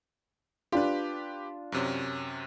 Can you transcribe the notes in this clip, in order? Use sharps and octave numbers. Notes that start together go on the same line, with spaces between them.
D4 F4 G4 B4
F#2 C3 C#4